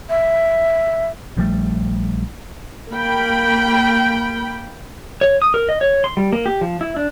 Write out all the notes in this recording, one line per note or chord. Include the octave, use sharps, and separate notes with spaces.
E5
A#1 F3 G3 A3
A#3 G5 B5
C#5
D#6
A#4
D#5
C#5
C6
G3
A#3
G4
F3
E4
D4